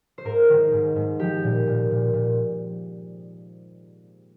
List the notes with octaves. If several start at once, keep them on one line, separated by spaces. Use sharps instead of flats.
C5
G#2 A#4
D#3
G#2
G#2
F3 G4
A#2
A#2
A#2
A#2